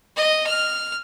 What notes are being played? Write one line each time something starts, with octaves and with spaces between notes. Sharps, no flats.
D#5
F6